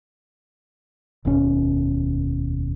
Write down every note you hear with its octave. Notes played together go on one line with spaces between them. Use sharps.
F1 D#2 B2 C#4